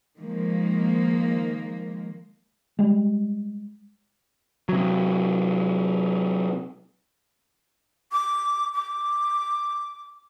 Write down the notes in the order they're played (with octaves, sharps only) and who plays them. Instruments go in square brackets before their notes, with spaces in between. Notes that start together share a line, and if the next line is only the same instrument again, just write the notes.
[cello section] D#3 F3 G#3 A#3
[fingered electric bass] G3 G#3
[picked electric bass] C3 F#3
[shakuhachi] D6
D6